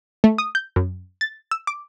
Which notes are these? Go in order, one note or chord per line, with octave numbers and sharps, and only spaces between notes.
A3
D#6
G6
F#2
A6
E6
D6